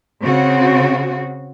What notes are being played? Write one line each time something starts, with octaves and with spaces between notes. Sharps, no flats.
C#3 C4 F#4